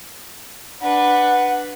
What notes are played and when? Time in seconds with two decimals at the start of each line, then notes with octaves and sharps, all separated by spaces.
0.82 D4 B4 F#5